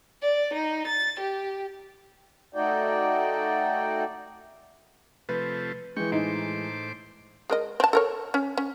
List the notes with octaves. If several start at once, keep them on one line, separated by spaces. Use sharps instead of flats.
D5
D#4
A6
G4
A3 D#4 F#4 D5 G5
C3 F3 A3 B4
E3 G#3 G5 C#6
A2 D#4 C5 D6
G#3 A#4 D#5
C4 A5
A4 A#4 C#5
C#4
C#4